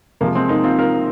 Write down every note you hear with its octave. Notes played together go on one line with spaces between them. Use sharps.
C3 F3 G#3 A#3
G#3 C4
A#3 D#4
C4 F4
F4 A#4